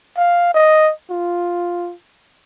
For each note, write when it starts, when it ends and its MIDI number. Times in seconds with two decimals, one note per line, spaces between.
0.17 0.51 77
0.54 0.92 75
1.10 1.93 65